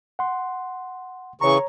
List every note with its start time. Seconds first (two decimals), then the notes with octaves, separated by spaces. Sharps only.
0.19 F#5 C6
1.41 C#3 E3 C#5 A#5 C#6